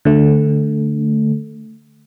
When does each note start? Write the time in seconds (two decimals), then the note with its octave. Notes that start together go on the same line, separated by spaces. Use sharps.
0.05 D3 A3